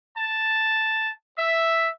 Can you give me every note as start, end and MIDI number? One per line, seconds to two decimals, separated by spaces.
0.17 1.12 81
1.38 1.88 76